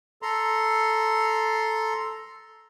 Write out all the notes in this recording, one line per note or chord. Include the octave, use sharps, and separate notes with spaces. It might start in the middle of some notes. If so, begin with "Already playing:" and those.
A4 A#5 C6